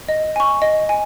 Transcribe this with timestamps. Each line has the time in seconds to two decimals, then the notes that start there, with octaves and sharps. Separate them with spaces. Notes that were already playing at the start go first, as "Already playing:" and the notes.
0.09 D#5
0.36 G#5 C#6
0.62 D#5
0.89 G#5